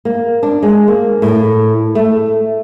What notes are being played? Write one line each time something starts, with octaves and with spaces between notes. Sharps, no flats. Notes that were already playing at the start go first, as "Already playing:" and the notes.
A#3
D4
G#3
A#3
A2
A3